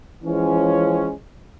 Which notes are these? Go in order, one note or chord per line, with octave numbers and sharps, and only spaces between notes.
E3 F3 G#3 C#4